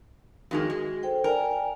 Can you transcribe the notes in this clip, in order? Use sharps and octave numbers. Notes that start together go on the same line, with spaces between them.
F2 D#3 G#3 F#4
G#3
A4 C5 G5
A#4 D5 G5 G#5